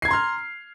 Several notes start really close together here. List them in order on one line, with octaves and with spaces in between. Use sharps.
C7 G#6 A#5 C6 F6